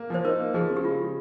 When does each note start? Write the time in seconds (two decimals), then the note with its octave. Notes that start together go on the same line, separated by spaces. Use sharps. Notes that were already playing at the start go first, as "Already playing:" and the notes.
Already playing: A#3
0.10 F3 C5
0.25 D#4 A#4
0.39 A#3
0.54 F3 G#4
0.69 C#3 G#4
0.77 G4
0.84 G#3 F4
0.95 G4
1.00 C#3 F4